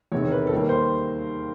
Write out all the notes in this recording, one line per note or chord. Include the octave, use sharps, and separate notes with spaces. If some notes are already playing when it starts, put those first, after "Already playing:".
E2 C3 D#3 C#5
A#4
B4
A4
D#2 D#3 G3 A#3 A#4
C5